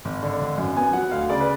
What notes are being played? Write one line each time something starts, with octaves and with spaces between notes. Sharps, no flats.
G#1
D3
G#1
F#2
B3 G#5
F#3 F#5
D2 F5
C#3 D5
B4